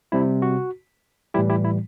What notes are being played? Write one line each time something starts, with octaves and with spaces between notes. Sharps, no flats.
C3 G3 C4 E4
F#4
A2 E3 G3 E4 G4
E4 G4
E4